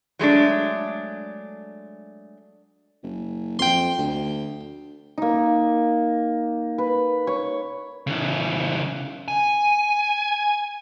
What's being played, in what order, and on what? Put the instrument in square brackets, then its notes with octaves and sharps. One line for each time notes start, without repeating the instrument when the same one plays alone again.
[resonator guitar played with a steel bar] F#3 G#3 A3 D4
[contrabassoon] F#1
[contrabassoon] F2 [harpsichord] G5 C6
[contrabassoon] D2
[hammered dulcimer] A#3 D#4
B4
C#5
[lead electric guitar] C#3 E3
G#5